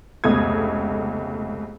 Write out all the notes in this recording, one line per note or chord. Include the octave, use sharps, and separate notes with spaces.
F1 C#2 B2 A3 D#6 G#6